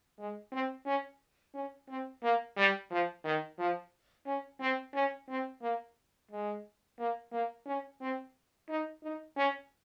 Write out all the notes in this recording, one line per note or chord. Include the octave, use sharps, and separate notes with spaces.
G#3
C4
C#4
C#4
C4
A#3
G3
F3
D#3
F3
C#4
C4
C#4
C4
A#3
G#3
A#3
A#3
C#4
C4
D#4
D#4
C#4